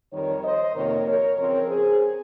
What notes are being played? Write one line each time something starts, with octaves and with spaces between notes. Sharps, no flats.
F2 D#3 G3 A#4 C#5
C5 D#5
F2 C3 D#3 A#3 A#4 C#5
A#4 C#5
C#3 F3 C4 A#4 C#5
G#4 C5